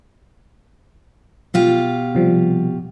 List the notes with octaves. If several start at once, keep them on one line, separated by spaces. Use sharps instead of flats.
B2 F4 G4
C3 F3 G3